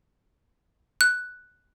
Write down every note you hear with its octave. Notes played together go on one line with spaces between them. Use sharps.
F#6